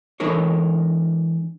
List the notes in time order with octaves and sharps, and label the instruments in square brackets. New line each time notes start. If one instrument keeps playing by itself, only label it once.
[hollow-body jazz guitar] E3 G#3 D4 A4 A#4 C#5